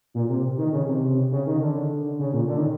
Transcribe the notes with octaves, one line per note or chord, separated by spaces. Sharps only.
A#2
C3
D#3
C#3
C3
C#3
D#3
D3
C#3
A#2
D3
D#3